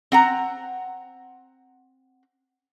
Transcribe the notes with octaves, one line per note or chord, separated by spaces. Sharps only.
C4 F#5 A#5